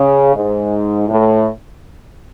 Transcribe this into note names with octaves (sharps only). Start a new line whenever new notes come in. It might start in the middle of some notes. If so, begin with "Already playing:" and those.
Already playing: C#3
G#2
A2